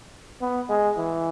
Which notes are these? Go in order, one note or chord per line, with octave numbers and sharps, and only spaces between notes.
B3
G#3
E3